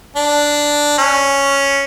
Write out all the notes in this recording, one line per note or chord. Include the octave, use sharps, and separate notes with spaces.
D4
C#4